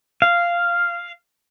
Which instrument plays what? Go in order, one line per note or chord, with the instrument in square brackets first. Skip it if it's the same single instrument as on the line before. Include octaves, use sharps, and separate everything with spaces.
[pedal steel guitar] F5